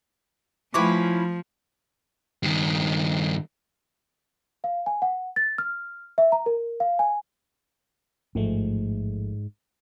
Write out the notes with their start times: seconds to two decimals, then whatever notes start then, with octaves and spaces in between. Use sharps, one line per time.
0.74 F3 A3 C#4 E4 B4 D6
2.43 G2 D#3
4.64 F5
4.86 G#5
5.02 F#5
5.36 A6
5.58 F6
6.18 E5
6.32 A#5
6.46 A#4
6.80 F5
6.99 G#5
8.35 A1 G#2 F3 A3